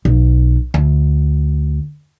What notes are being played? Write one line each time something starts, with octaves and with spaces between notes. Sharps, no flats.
B1
D2